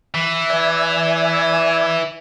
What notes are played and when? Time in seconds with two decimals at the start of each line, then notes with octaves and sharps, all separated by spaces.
0.14 E3
0.50 D5 E5 G#5